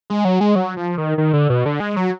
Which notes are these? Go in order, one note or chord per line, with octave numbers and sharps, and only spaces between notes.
G#3
F#3
G#3
F#3
F3
D#3
D#3
D3
B2
D3
G#3
F#3